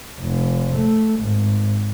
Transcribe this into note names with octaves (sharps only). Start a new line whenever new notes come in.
F1
A3
G#1